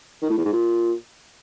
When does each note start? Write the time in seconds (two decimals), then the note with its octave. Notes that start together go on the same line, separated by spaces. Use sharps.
0.22 D#3
0.30 A2
0.37 E2
0.45 G#2
0.52 A#2